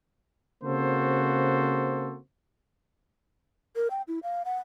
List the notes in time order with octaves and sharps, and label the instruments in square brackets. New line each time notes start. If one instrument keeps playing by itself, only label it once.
[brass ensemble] C#3 A#3 C4 F#4 A4 C5
[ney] A#4
G5
E4
F5
F#5